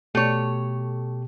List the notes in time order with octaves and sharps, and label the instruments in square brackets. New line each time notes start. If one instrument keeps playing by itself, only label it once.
[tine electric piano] B2 G4 [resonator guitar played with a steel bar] A3 C#5